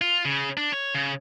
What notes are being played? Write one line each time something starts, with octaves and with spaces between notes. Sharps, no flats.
F4
C#3
D4
C#5
C#3